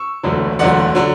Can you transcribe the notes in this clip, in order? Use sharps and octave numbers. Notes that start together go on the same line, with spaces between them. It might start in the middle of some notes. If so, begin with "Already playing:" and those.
Already playing: C#6 E6
E1 D2 D3 F#3
E1 D2 D3 F#3 D5 F#5
D3 F#3